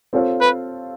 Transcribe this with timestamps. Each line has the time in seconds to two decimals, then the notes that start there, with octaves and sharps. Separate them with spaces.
0.13 C4 F4 A4 C#5 F5
0.41 B4